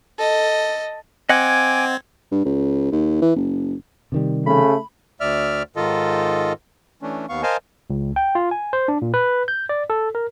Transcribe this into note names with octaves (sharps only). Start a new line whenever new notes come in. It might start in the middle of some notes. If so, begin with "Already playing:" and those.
A4 D#5
C4 D#5 F#5 G#5 D6 G#6
G2
C#2
D#2
E3
F#1
C3 D#3 G3
C#3 A3 B5
D2 D5 E5 F6
G#2 D#3 F4 A4 D#5
E3 A3 C#4 D4
D#2 B3 F5 C#6
A#4 C5 D#5 F5 G#5 A5
C#2
G5
F4
G#5
C5
D4
A#2
B4
G6
D5
A4
A#4